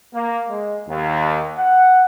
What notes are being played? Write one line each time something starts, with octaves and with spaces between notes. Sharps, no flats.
A#3
G#3
D#2
F#5